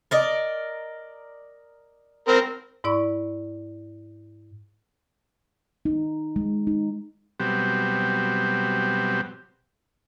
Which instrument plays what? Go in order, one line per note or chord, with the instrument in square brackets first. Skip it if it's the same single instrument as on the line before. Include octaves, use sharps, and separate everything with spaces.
[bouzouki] A#4 D5 D#5
[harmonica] C4 A#4
[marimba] G#2 E4 D5 B5 C#6
[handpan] D#4
G#3
D#4
[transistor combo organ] B2 F#3 G3 C4 G4